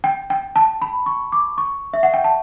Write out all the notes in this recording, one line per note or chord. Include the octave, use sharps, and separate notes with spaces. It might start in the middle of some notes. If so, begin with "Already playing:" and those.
G5
G5
A5
B5
C#6
D6
C#6
E5
F#5
G5
A5